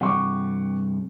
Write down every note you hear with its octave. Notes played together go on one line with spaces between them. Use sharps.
G2 C3 G3 F#5 C#6 D6